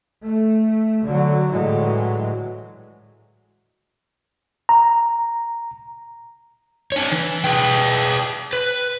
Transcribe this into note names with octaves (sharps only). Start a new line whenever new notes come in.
A3
D3 F#3
A2 D3 E3 F#3 G#3
A#5
D4 C#5
E3
G#4 B4 G5
B4